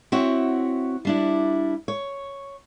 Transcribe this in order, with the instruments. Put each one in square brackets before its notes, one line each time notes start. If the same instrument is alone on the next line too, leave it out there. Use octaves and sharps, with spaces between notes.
[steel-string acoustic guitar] C4 E4 F#4 C#5
G3 D4 E4
C#5